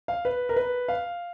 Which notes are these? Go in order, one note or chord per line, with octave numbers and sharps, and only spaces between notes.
F5
B4
A#4
B4
F5